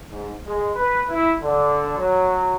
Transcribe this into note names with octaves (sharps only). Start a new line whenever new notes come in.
G#2
G#3
B4
E4
D3
F#3